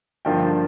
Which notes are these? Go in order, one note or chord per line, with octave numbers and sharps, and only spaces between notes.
G2 D3 F3 A#3 F4 G5